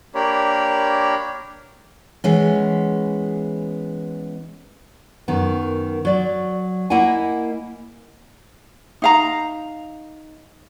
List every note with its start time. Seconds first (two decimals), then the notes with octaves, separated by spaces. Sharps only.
0.15 A#3 D4 G4 A#4 C#5 B5
2.24 E3 G#3 B3 C#4
5.28 F#2 D#3 B3
6.05 F#3 D5
6.90 A#3 E4 A#4 D#5 F#5 G#5
9.02 D#4 F5 A#5